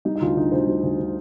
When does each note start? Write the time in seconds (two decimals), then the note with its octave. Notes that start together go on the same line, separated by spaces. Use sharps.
0.05 G3 D#4
0.16 D#4
0.21 D2 F4
0.36 D3 D#4
0.52 D2 C5
0.67 G3
0.83 D2
0.99 D3